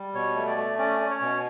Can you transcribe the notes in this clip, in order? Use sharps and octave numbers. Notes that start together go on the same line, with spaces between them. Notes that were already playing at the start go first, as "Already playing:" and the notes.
Already playing: G3
B2 C#5
A3
D5
A3
C#4 D5
C#4
C#5
B2